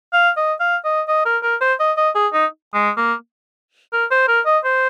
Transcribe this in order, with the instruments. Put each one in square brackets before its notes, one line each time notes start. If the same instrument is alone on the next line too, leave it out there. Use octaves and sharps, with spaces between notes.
[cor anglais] F5
D#5
F5
D#5
D#5
A#4
A#4
C5
D#5
D#5
G#4
D#4
G#3
A#3
A#4
C5
A#4
D#5
C5